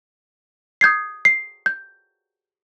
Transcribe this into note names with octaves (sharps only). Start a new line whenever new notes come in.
D#6 G6 G#6 C7
C7
G6